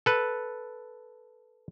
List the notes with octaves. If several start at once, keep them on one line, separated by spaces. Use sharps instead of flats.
A4 B4